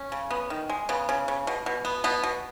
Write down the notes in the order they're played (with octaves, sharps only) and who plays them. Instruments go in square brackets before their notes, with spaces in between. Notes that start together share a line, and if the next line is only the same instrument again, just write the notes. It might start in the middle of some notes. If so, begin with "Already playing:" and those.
Already playing: [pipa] C#4
C#3
B3
D#3
G#3
C#3 B3
C#3
C#3
B2
B2
B3
B2 B3
B2